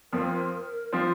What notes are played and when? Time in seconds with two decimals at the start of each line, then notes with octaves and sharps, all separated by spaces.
0.13 F2 F3 C4 A#4
0.92 F3 C4 F4